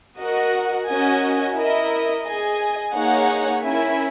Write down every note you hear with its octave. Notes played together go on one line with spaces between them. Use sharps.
F#4 A#4 D#5 F#5
C#4 F#4 A#4 D#5 G#5
E4 A#4 D#5
G#4 D#5 G#5
A#3 D#4 G#4 C#5 F#5
C#4 E4 A#4 E5 G#5